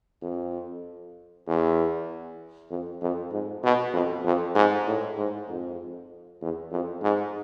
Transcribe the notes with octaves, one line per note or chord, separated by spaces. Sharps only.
F2
E2
F2
F2
G#2
B2
F2
F2
G#2
A2
G#2
F2
E2
F2
G#2